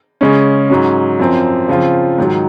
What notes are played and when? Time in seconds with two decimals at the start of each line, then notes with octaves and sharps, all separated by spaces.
0.21 C#3 G#3 C#4
0.70 G#2 F#3 C#4
1.19 F#2 F3 C4
1.68 C#3 F3 C4 F4
2.18 G#2 D#3 F#3